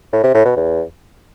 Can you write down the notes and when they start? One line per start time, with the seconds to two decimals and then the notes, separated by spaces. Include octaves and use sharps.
0.13 A2
0.24 C3
0.34 A2
0.45 B2
0.56 E2